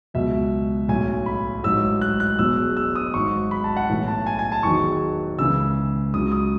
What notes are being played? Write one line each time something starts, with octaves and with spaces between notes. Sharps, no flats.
C#2 B2 F#3 E5
B1 A2 F#3 G#5
B5
A1 G#2 F#3 E6
F#6
F#6
E1 E2 B2 F#3 E6
E6
D#6
G#1 G#2 F#3 C#6
B5
A5
F#5
B1 A2 E3
A5
G#5
G#5
A5
E1 E2 D#3 F#3 C#6
C#2 C#3 E3 E6
C#2 C#3 F#3 D#6
D#6